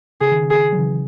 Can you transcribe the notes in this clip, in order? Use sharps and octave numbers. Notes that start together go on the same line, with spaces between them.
C#3 G#4
D#3
C#3
G#4
F#3
C#3 E3